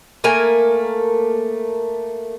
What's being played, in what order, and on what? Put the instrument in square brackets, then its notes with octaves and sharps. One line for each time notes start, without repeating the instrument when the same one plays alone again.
[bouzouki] A3 A#3 A#4 G#5